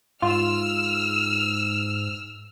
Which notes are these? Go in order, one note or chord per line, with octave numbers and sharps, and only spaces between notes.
G#2 F4 E6 F6